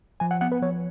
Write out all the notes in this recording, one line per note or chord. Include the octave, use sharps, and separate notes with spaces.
F3 G#5
F#5
B3 F#5
B4
F3 C#5